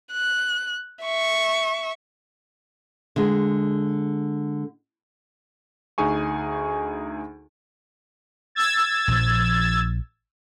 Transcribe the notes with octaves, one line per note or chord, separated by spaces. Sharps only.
F#6
E5 C#6
D3 G#3
D2 D#4 G#4 G#5 C#6
E6 G#6 A6
A#1 F3